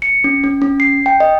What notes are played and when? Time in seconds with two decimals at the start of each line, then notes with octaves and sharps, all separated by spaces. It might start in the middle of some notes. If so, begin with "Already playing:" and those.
0.02 C#7
0.24 C#4
0.44 C#4
0.62 C#4
0.80 C7
1.06 G5
1.20 D#5